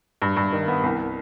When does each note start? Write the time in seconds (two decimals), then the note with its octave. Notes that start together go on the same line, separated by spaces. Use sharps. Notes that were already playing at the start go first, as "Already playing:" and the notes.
0.22 G2
0.37 G2
0.53 D#3
0.68 B3
0.83 C2